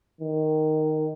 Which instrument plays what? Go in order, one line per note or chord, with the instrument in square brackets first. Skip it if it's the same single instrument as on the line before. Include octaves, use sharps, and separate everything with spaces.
[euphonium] D#3